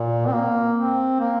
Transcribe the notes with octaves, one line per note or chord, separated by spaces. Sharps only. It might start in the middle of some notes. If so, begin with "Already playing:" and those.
Already playing: A#2
C4
A#3
C4
A#3